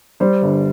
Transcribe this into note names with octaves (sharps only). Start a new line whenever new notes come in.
G3 C5
G1